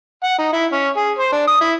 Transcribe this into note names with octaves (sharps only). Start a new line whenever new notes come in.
F#5
D#4
E4
C#4
G#4
C5
D4
D#6
E4